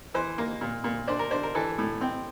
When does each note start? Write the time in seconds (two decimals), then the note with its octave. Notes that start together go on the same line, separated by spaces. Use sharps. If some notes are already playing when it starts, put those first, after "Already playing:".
0.14 E3 C5
0.38 A#3
0.61 A#2
0.84 A#2
1.07 D4 C5
1.19 A#4
1.31 D4 C5
1.43 A#4
1.55 E3 A4
1.78 A2
2.01 C4